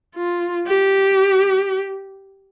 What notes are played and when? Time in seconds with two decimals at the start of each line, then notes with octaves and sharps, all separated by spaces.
0.16 F4
0.67 G4